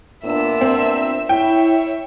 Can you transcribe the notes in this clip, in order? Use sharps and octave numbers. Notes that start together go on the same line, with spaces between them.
A#2 B3 D4 E5 E6
C4
E4 C#5 E5 G5